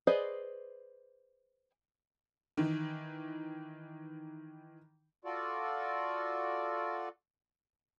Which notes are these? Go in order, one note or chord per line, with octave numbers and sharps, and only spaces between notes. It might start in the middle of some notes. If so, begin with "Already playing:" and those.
G#4 B4 C5 D5 D#5
D#3 E3
F4 F#4 A4 D5